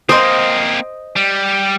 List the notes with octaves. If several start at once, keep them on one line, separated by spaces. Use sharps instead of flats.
A#3 C4 C5 D#5 C6 D#6
G3